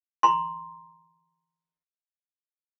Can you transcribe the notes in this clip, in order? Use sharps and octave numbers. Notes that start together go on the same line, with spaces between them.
A#5 C6